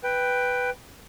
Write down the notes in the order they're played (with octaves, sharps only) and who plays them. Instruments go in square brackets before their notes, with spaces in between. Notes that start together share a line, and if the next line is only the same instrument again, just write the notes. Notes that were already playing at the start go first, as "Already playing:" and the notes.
[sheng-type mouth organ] B4 G5